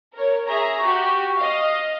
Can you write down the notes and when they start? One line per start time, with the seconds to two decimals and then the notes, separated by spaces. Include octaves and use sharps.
0.13 A#4 C#5
0.48 G#4 E5 A#5 C#6
0.84 F#4 G4
1.37 D#5 F5